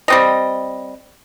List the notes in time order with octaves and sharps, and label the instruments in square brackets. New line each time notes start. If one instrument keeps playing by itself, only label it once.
[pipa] G3 C4 D#5